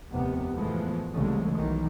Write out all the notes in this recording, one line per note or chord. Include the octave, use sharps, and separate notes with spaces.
F1 D#2 C3 B3
A2 E3 F3 G#3 A3 B3
C2 C#3 E3 G#3 A3
B1 D#3 E3